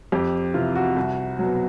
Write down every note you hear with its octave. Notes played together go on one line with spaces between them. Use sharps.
F2 G4
C3 E3 F4
F#4
C2
B2 F#3